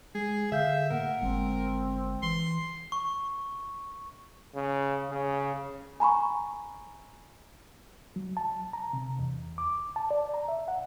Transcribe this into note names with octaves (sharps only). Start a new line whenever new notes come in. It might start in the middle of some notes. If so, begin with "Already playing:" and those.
G#3 G#4
D3 G#4 E5 F5 G6
A2 A#3 A#4 F#5
G1 G#3 C4
E3 C6
C#6
C#3
C#3
G#5 A#5 B5 C#6
F#3
A5
A#5
C3
E2
D6
A5
D5
A#5
E5
F#5